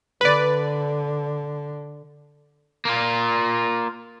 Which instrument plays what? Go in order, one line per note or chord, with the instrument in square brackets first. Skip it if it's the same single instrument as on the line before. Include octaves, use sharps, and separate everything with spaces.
[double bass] D3 [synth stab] B4 D5
[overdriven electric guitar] A#3 F4